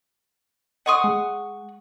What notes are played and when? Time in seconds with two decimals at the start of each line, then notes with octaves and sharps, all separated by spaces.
0.86 D#5 F#5 C6 C#6 D#6
1.04 G#3